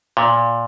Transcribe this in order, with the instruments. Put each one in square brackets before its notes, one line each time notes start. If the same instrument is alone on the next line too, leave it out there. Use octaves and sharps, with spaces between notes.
[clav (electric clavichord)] A#2